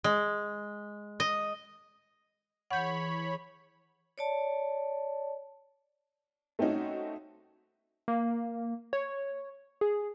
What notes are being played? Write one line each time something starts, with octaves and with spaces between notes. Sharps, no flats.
G#3
D#5
E3 G#4 C#5 F#5 B5 G6
C#5 D5 A5
A3 C4 C#4 D#4 F#4
A#3
C#5
G#4